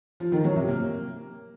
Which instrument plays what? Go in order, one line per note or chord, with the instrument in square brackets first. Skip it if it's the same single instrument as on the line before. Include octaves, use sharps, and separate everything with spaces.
[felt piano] F3
D#3
F#3
C3
A#3